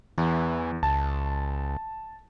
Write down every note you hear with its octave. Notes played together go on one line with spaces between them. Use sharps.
E2 E3
C#2 A5